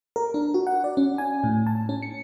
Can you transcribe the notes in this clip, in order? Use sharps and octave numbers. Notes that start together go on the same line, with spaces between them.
A#4
D4
F#4
F#5
D5
C#4
G#5
A2
A5
C#4
C#7